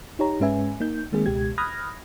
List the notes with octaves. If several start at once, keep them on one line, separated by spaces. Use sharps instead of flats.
D#4 G4 C#5 A#5
G#2 G#3 C#4 B4 E5 G#5
A#3 D#4 G6
D#3 G#3 A#3 C4 G#4
C#2 B2 G#3 G4 G#6
B5 D#6 F6 F#6 G#6 A#6